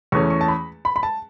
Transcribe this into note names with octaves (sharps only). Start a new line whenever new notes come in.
E2 E3 A3 C#4 C#6
C#6
A5
B5
B5
B5
A5